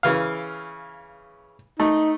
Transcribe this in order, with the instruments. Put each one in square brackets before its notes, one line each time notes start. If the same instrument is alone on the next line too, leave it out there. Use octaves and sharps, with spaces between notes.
[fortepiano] C#3 E3 F5
[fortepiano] A3 [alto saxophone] D#4